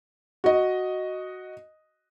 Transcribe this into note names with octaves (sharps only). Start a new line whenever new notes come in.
F#4 D#5